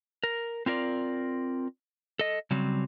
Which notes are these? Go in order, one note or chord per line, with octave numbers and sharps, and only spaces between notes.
A#4
C4 F4 A#4 D5
A4 D#5
C#3 F#3 G3 C4